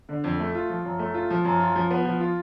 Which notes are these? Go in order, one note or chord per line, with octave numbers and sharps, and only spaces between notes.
D3
F2
A3
F4
F3
F#2
A3
F4
F3
F#2
F4
F3
B3
F3
F4